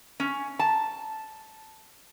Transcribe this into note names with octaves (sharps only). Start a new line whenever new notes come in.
C#4
A5